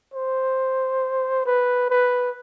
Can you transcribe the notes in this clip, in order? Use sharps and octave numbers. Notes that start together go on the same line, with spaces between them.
C5
B4
B4